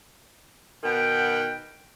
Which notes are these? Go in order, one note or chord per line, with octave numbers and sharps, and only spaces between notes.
B2 D#3 F#5 G5